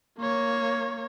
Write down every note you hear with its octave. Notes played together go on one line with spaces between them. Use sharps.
A#3 C#5